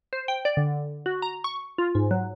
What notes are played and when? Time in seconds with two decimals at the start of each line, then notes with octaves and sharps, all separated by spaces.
0.13 C5
0.28 G5
0.45 D5
0.57 D3
1.06 F#4
1.22 A#5
1.44 C#6
1.78 F4
1.95 G#2
2.11 F#3